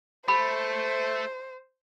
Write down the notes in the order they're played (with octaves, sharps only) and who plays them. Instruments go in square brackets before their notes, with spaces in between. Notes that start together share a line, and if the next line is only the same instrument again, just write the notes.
[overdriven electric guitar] A3 [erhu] C5 [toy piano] B5